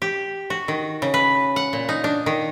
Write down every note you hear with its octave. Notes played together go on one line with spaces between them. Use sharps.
G4
F#4
D#3
C#3
B4
F#5
A#2
D#4
D4
D#3